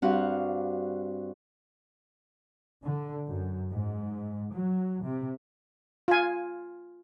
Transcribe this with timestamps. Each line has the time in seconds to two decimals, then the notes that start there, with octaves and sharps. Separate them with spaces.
0.02 G2 C4 D4 F#4 F5 F#5
2.84 D3
3.28 F#2
3.71 G#2
4.53 F#3
5.04 C3
6.08 F4 G#5